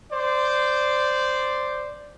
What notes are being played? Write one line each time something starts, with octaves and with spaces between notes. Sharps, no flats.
C5 D5